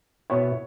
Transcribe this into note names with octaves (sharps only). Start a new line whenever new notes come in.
B2 B3 E4 C#5